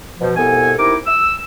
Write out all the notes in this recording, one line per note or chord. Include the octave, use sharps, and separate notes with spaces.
B2 F3
C2 B2 B3 A4 G#5
C3 D#4 E4 A#4 D6
E6